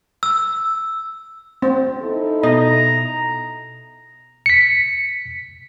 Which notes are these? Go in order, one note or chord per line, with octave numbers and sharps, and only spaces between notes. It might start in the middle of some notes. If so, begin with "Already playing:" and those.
E6
C4
D#4 E4 A4
B2 D#5 A#5
B6 C#7